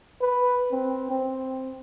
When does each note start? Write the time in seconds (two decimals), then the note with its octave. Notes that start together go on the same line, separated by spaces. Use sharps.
0.21 B4
0.71 C4
1.11 C4